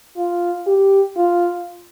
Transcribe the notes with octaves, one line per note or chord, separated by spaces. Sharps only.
F4
G4
F4